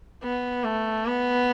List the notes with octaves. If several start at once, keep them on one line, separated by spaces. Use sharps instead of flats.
B3
A3
B3